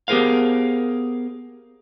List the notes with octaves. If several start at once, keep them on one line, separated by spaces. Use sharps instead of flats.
B3 G4 G#4 A#4 C5 F5